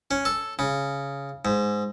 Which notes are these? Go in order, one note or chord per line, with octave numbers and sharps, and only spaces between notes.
C#4
A4
C#3
G#2